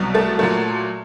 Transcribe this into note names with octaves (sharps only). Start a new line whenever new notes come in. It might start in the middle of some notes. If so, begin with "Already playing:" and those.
Already playing: C2 B2 F#3
A3 A4
A#2 F#3 A3